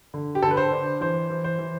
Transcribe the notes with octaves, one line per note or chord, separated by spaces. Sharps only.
D3
G4
D3 A4
B4
C5
D4
E3 C5
E3
C5
E3